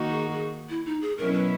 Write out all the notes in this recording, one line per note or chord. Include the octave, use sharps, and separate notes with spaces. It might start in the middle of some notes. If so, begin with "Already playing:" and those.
Already playing: D#3 A#3 D#4 F#4
G#4
G#4
E4
D#4
G#4
B2 F#3 C#4 E4 A#4
B4